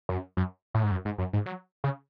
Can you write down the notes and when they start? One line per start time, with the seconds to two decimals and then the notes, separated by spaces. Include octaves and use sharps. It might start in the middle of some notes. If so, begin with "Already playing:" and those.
0.09 F#2
0.37 F#2
0.74 A2
0.83 G#2
0.91 F#2
1.05 G#2
1.18 F#2
1.33 G#2
1.46 F#3
1.84 C#3